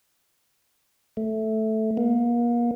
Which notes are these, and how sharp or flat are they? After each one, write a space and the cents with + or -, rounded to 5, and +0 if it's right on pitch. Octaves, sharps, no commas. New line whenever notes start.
A3 -5
A#3 +35